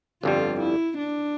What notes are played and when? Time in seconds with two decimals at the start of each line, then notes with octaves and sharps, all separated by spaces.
0.23 G1 F2 D3 G3 F4
0.60 E4
0.98 D4